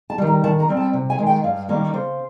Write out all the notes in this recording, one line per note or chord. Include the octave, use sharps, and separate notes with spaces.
A5
D#3 G3
A#5
D#3 A5
A#5
G3 C4
A5
C3
G#5
D#3 G#3
G5
G2 F5
D#3 G3 A#3 C#4
C#3 C5